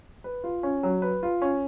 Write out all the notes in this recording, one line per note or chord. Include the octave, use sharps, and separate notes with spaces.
B4
F4
C#4
F#3
B4
F4
C#4